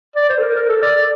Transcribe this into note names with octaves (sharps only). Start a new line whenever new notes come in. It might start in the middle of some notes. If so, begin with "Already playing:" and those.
D5
C5
A4
A#4
A#4
A4
D5